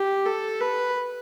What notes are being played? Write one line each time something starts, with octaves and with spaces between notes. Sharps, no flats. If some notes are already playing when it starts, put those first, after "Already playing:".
Already playing: G4
A4
B4